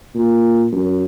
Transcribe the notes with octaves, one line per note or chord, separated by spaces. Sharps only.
A#2
F#2